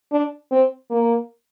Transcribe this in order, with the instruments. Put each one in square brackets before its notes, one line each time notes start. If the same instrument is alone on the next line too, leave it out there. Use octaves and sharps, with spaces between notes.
[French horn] D4
C4
A#3